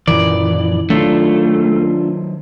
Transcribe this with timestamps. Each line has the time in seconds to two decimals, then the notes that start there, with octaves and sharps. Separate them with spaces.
0.08 F#2 A#2 D#3 E3 D5
0.90 D#3 F#3 A3 D4 F4